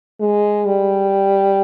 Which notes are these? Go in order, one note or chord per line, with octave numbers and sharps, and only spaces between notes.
G#3
G3